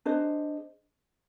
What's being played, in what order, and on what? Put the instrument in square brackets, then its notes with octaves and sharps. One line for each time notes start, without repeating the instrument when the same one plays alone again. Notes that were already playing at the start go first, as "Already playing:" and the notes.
[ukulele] D4 G#4 C5 D#5